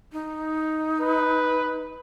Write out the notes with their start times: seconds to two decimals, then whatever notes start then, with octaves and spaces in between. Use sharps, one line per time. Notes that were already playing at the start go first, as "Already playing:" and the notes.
0.13 D#4
1.00 B4